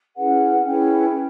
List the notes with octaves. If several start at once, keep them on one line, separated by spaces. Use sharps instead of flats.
C#4 E4 G#4 B4 F#5
C#4 E4 G#4 B4 G5